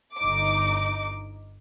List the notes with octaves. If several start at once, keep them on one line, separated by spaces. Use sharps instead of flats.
G1 D#4 D6